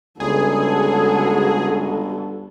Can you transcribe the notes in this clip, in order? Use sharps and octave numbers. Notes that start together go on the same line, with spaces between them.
G1 C#2 F#4 G#4 A4